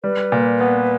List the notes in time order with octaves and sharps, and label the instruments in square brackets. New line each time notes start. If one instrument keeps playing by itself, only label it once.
[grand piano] G3 [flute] B4
[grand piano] A#2
B3